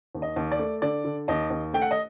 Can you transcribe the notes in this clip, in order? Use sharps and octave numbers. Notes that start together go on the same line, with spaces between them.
D#2
D#5
D#2
D5
A3
D3 D5
D3
D#2 D#5
D#2
A3 G5
F#5
D#5